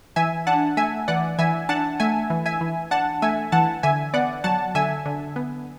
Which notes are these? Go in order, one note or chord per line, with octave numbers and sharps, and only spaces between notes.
E3 E5 G#5
D4 F#5 A5
A3 E5 G#5
E3 D5 F#5
E3 E5 G#5
D4 F#5 A5
A3 E5 G#5
E3
E5 G#5
E3
D4 F#5 A5
A3 E5 G#5
E3 F#5 A5
D3 E5 G#5
B3 D5 F#5
F#3 F#5 A5
D3 E5 G#5
D3
B3